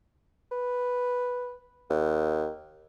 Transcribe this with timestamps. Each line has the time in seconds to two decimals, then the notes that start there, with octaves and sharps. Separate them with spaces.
0.52 B4
1.90 D#2